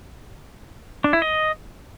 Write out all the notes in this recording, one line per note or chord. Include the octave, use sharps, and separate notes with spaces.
D4
E4
D#5